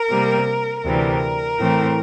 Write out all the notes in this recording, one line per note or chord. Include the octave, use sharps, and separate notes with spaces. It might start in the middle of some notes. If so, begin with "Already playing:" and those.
Already playing: A#4
C3 G3 A#3
D2 C3 E3 G3 A#4
A2 E3 A3 C4